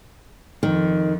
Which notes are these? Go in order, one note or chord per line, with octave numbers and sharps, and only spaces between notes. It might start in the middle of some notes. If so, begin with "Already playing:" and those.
F2 D#3